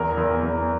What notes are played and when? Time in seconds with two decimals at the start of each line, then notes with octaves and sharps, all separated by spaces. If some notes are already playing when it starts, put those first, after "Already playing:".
Already playing: E2 A#4
0.17 E2
0.43 E2